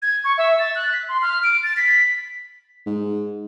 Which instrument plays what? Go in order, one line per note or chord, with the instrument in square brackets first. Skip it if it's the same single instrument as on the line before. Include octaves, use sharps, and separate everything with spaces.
[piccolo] G#6
C#6
E5
A6
F#6
B6
C6
F6
D7
A6
B6
[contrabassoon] G#2